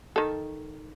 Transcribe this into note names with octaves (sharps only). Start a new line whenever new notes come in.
D#3 A4